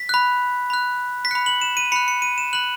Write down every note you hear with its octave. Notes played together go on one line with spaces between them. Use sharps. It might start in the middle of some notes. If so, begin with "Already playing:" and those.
Already playing: B6
B5 F#6
B5 F#6
B6
B5 F#6 C#7
F#7
E7
D#7
B5 F#6 C#7
C#7
D#7
E7
B5 F#6 F#7